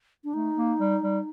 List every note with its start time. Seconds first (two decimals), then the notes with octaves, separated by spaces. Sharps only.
0.24 D4
0.34 A3 D#4
0.57 A#3
0.80 G3
1.03 G3